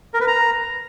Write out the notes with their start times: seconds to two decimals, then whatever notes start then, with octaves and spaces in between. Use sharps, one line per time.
0.14 A#4
0.21 B4
0.27 A#5